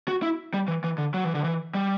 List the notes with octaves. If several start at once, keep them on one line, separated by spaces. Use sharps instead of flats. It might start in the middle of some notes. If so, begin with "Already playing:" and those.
F#4
E4
G3
E3
E3
D3
F#3
E3
D3
E3
G3